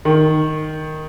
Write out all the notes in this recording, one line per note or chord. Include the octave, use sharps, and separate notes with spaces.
D#3